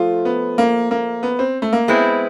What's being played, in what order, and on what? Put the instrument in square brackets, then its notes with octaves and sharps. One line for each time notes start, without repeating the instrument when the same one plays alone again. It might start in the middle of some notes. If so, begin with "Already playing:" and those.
Already playing: [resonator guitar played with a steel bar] F3 A3 [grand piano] F4
[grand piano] B3
A#3
A#3
B3
C4
A3
A#3
[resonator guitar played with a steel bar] G#3 C4 E4 [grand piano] B3